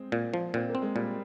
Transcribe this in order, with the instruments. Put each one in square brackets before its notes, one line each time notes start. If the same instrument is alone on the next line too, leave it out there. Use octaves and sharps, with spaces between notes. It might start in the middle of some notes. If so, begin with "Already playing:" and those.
Already playing: [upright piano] G#3 C4
[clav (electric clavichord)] A#2
F3
[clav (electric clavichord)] A#2 [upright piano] C4
[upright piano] A#3
[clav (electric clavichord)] C4
[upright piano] G#3
[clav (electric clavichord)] A#2 [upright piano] G3